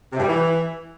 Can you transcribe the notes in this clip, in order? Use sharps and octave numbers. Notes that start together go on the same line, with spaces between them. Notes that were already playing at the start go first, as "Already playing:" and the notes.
C3
G2
G3
E3